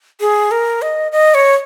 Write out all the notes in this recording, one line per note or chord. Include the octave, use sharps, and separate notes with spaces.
G#4
A#4
D#5
D#5
C#5